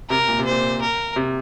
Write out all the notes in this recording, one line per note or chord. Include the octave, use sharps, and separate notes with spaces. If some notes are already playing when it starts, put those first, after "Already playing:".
C3 A#4
A#2
C3
C5
A#2
A#4
C3